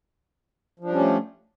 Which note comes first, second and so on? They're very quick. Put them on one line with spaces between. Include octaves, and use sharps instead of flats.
F3 D4 G3 C#4 A3